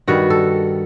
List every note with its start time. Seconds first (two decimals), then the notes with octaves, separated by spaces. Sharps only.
0.08 G2 D#3 G3 F#4
0.30 A4